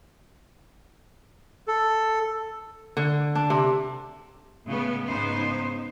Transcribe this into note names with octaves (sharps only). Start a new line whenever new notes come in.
A4
D3
D4
C3
A2 C#3 G#3 B3
G#2 C#3 B3 D#4 C5